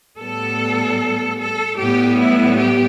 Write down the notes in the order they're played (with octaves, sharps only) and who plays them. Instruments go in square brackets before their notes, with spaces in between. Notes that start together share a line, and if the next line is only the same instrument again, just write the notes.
[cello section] A2 G3 B3 A4
A4
A2 G3 B3 G4
E4
G4